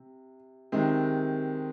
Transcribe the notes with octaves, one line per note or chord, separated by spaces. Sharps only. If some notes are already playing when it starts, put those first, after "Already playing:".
Already playing: C3
C3 D#3 G#3 C4